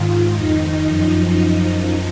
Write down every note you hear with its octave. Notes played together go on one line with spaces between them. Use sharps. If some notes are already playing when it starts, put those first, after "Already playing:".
Already playing: G#2 D#3 F4
F2 D#3 D#4
F#2 F3